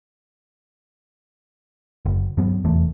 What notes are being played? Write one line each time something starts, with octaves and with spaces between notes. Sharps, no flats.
F#1
G2 F#3 B3
F1 E2 E3 A3